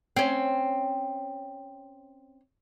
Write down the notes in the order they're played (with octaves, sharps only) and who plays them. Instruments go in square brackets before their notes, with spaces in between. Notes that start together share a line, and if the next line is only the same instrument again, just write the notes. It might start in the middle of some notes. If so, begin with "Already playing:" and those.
[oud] C4 C#4